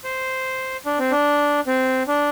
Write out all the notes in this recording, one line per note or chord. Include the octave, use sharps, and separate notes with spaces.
C5
D4
C4
D4
C4
D4